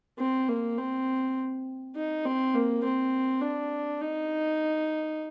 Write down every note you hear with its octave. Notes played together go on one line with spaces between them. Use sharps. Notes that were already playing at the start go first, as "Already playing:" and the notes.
C4
A#3
C4
D#4
C4
A#3
C4
D4
D#4